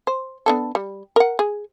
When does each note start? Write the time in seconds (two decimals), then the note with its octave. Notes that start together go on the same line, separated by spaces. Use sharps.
0.07 C5
0.46 B3 D4 A4
0.75 G3
1.16 A#4 F#5
1.39 G#4